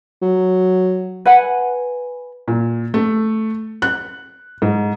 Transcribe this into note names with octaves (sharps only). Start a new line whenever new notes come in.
F#3
B4 F#5 G#5
A#2
A3
F#6
G#2